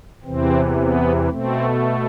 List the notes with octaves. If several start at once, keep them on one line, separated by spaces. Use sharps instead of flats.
E2 C3 E3 C4
B3
B2 A3 C4